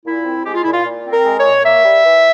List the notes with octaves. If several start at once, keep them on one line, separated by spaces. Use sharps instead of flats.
A#2 E4
C4
G#3 G4
F4
A#2 E4
F4
A#2
C4
A#4
G#3
C#5
A#2
A#3 E5
G3
E3